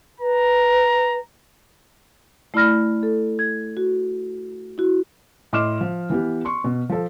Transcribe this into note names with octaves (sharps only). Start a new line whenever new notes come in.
B4 A#5
A3 E4 D5 B5 F6 A#6
A4
G#6
F#4
E4 F#4
A2 D#5 C6 D6 F6 E7
F3
E3 B3 G4
C6 C#6
B2
F3 A4